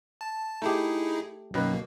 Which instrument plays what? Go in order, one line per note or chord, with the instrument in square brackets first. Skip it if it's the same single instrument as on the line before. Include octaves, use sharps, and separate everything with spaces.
[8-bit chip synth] A5
[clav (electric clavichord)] A3 G4 [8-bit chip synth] D#4 E4 G#4
[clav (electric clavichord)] F#2 D#3 B4 [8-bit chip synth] B2 A#3